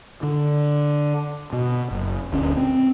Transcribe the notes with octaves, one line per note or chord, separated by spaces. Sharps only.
D3
B2
F#1
D#1 D2 C#4
C4